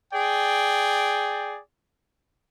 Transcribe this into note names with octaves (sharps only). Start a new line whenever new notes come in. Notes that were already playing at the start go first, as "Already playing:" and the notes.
G#4 D5 G5